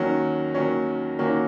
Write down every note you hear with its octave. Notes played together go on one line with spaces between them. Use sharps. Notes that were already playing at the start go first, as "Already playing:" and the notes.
Already playing: D#2 D#3 F#3 C#4
D#2 D#3 F#3 C#4
D#2 D#3 F#3 A#3 C#4